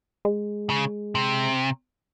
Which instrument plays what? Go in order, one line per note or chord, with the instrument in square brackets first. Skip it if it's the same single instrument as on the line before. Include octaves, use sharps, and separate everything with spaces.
[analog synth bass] G#3
[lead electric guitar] C#3
C3